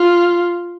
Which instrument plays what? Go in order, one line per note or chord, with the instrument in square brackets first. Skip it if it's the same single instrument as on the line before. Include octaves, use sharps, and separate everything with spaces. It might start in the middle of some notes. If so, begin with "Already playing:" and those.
Already playing: [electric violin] F4